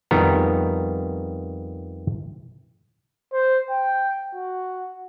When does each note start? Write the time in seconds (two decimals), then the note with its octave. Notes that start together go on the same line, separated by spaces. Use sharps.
0.11 F2 D#3 G3 B3 A#5
3.33 C5
3.70 G5
4.35 F#4